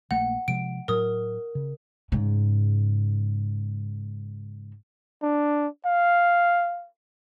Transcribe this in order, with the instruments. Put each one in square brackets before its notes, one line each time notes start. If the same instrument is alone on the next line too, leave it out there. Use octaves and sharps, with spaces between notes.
[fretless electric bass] A#1 A3 A#3 [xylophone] F#5
[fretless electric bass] C3 F3 G#3 [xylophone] D7
[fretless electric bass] A2 F#3 [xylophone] A#4 D#6
[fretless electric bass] C#3
[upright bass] G#2 C#3
[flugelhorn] D4
F5